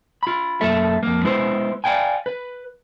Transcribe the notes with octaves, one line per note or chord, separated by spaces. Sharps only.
F4 B5
F#2 A#3 A4 E5
F2 A#3
G#3 B3 E4 B4 C5
D5 D#5 F5 G5 G#5
B4